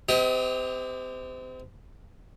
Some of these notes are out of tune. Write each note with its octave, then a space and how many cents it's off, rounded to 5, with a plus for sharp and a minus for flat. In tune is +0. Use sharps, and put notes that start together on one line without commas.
C4 -35 G4 +20 D#5 +30